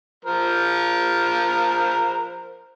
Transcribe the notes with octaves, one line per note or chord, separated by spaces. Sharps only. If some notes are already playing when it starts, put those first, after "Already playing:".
F3 A#4 C5